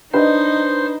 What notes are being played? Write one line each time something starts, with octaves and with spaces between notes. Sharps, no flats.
D4 D#4 B4 C5 D#5